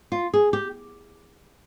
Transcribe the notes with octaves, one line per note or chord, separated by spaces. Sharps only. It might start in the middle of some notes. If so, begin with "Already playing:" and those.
F4
G#4
G4